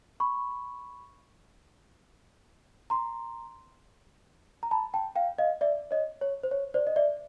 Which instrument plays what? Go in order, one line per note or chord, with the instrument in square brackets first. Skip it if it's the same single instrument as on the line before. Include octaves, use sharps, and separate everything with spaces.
[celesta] B5 C#6
A#5 C6
A#5
A5 B5
G5 A5
F5 G5
D#5 F5
D5 E5
C#5 D#5
C#5
C5
C#5
C5 D5
D#5
D5 E5